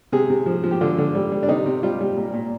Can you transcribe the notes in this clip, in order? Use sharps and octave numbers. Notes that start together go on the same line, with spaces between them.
C3 G#4
C3
F3
F3
G4
D3 F4
D3
G3
G3
D4
C3 D#4
C3
G3 F4
G3
A#2
A#2